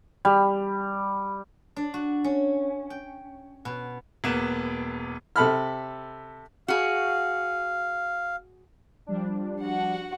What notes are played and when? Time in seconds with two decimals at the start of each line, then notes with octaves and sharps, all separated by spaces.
0.25 G3
1.76 D4
1.94 F#4
2.24 C#4
2.90 G5
3.65 B2
4.24 E1 A#3 B3 E7
5.36 C3 A4 B5 F6
6.68 F#4 G#4 F5
9.07 F3 G3 D4
9.62 F#4 F#5